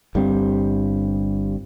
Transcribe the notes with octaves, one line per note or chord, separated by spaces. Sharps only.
G1 G2 G3 C4